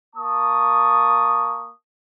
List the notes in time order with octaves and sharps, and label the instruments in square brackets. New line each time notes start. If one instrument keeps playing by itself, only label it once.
[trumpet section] A#3 A5 C#6 D#6